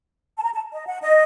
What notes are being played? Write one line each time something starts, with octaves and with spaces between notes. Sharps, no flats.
A5
A#5
A5
D#5
F#5
D#5